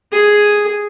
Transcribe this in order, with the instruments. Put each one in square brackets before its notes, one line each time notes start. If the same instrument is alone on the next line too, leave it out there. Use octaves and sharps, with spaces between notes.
[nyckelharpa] G#4